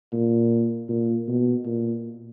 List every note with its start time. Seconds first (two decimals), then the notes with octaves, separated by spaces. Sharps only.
0.13 A#2
0.89 A#2
1.28 B2
1.66 A#2